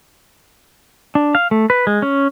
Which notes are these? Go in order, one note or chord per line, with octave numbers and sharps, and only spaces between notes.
D4
F5
A3
B4
G#3
C#4